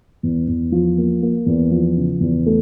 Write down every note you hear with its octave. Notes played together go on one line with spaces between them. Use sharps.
E2
E2
F3
A#3
A#3
E2
F3
C#3
E2
A3